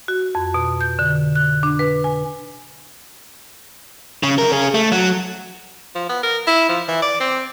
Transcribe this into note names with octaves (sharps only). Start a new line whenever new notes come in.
F#4
F2
B2
G6
D3
F#6
D4
B4
G#5
C#3
F#2 A#4
C#4 G#4
A3
F#3
F3
B3
A#4
E4
F3
E3
D5
C4